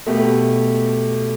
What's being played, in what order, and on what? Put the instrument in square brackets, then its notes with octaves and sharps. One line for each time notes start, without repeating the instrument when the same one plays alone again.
[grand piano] B2 A3 G4